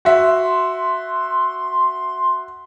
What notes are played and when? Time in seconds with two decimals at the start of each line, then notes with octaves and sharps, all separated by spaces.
0.05 F#4 E5 C6